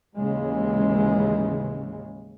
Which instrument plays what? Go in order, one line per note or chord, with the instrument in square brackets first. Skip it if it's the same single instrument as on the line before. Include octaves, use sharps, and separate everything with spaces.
[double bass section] A1 D#2 C#3 E3 G#3